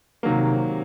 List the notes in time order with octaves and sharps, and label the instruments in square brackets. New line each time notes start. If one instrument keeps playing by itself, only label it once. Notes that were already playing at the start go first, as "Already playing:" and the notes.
[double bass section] C3 [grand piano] D#3 F#3 A#3